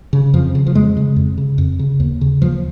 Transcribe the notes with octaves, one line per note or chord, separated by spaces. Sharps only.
C#3
F2 F3
C#3
F3
F2 G#3
C#3
F2
C#3
F2
C#3
D#2
C#3
D#2 F3